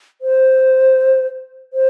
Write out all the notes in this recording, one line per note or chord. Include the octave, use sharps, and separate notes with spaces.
C5
C5